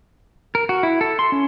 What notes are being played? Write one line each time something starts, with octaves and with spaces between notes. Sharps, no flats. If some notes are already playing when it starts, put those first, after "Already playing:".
A#4
F#4
E4
A4
C6
C#4